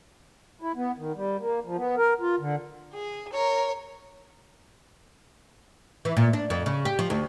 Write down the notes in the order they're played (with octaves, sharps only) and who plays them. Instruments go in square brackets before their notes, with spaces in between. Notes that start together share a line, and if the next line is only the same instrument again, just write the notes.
[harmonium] E4
B3
D#3
G3
A#3
F3
B3
A#4
F4
D3
[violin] G#4
A#4 C#5
[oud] E3
A#2
D4
F2
C#3
G4
F3
D2